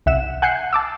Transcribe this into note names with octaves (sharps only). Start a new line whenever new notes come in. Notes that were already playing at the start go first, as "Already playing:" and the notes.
C2 E5 F#5 E7
F#5 G#5 F#6 G6 C7 C#7
A5 D6 E6